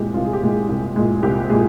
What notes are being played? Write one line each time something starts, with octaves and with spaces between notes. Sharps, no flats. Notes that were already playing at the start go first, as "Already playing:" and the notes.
Already playing: C2 A#2 G#3 G4
C2 F4
G#4
G4
A#2 G#3
G#4
C2
A#2 G#3
C2 G4
A#2 G#3 G#4